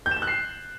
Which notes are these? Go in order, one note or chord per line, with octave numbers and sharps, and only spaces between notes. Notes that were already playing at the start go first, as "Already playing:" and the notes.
G6
E7
G6
F#6
C7